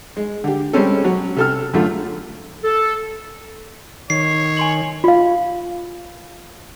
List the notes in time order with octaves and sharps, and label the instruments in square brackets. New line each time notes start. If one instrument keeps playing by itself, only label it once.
[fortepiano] G#3
D3 G4
G3 G#3 C4 C#4 A4
F#3 C#4
C3 A4 F6
F#2 D3 A3 F4
[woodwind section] A4
[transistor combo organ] D#3 [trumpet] C#5 [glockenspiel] C7
[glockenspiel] G#5 C6 F#7
[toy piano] F4 F5